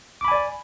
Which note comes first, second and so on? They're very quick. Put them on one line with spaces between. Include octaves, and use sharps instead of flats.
D6 B5 G#5 D5